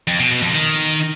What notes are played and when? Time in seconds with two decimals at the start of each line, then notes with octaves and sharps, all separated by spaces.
0.07 F2
0.19 B2
0.31 B2
0.43 F2
0.54 D#3